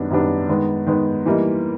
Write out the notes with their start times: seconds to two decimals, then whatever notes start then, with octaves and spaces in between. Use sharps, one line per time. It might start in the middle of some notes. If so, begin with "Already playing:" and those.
Already playing: F#2 D#3 G3 B3 D4
0.10 F#2 D#3 G3 B3 D4
0.49 D#3 G#3 B3
0.86 D#3 G#3 B3
1.26 E3 G3 A#3 D#4